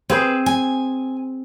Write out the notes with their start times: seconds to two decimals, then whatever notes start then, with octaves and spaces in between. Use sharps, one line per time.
0.10 C4 G#4 B4 C5
0.46 G#5